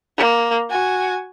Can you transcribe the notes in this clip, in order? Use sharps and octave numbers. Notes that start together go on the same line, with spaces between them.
A#3
F#4 G#5